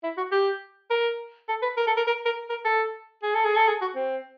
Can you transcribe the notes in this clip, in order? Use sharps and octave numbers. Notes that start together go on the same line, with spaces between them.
E4
F#4
G4
A#4
A4
B4
A#4
A4
A#4
A#4
A#4
A#4
A4
G#4
A4
G#4
A4
G#4
F#4
C4